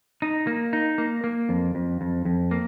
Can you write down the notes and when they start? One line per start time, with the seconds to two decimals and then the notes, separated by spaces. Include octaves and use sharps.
0.22 D#4
0.47 A#3
0.73 D#4
0.98 A#3
1.24 A#3
1.49 F2
1.75 F2
2.01 F2
2.25 F2
2.51 A#3